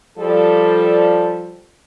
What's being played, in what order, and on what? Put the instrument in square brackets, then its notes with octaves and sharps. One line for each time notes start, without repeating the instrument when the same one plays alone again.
[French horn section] F3 G3 A4